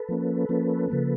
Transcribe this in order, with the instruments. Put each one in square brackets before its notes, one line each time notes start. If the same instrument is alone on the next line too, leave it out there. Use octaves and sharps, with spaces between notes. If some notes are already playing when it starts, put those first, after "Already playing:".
Already playing: [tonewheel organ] A4 B4
F3 A#3 C#4
F3 A#3 C#4
C#3 F3 A#3